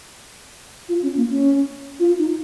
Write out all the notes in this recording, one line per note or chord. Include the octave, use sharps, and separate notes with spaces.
F4
C#4
A#3
C#4
F4
D#4